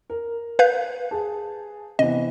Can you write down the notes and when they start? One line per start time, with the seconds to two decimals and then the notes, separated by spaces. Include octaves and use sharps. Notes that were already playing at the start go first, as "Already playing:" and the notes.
0.10 A#4
0.59 B4 F5 G6
1.11 G#4 A5
1.99 C3 E3 B3 D#5